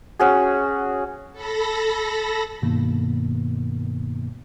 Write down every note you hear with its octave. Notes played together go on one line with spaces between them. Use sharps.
C#4 F#4 G#4
A4 B5 A#6
G2 B2 D#3 A#3 B3